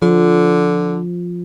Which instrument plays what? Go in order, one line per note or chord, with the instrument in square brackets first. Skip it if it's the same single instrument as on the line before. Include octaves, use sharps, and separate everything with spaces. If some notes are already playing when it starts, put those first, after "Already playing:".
[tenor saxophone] D3 [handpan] F3